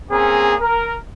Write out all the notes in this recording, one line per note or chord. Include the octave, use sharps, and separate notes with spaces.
A#3 C4 C#4 G#4 A#5
A#4